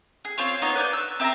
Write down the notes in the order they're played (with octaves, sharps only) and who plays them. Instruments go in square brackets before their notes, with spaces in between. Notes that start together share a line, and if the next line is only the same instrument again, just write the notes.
[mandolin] G#4
C4 F4 C#5
B3 D#4 C#5 D#5
B4 D5 G#5 G6
E6
C4 E5 A5 A#5